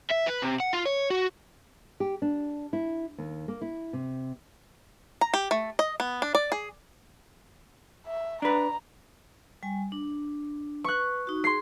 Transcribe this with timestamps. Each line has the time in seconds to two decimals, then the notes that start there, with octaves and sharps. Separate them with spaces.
0.10 E5
0.27 B4
0.42 C3
0.60 F#5
0.73 F4
0.86 C#5
1.10 F#4
2.00 G4
2.22 D4
2.73 E4
3.18 D#2
3.48 A#3
3.61 E4
3.93 C3
5.21 A#5
5.34 G4
5.51 A3
5.79 D#5
6.00 B3
6.22 D4
6.35 D5
6.52 G#4
8.06 E5
8.42 D4 B4 A#5
9.63 G3 G#5
9.92 D4
10.84 B4 C#6 F#6
11.27 D#4 F#4
11.44 G#4 C6 C7